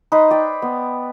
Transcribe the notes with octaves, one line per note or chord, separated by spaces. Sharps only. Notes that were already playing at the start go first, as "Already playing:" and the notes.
D#4 B4 C5
D5 G5
B3